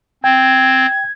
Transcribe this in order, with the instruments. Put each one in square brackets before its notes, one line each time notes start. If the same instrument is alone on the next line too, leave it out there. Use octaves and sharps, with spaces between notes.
[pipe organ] C4 [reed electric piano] G5 [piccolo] G#6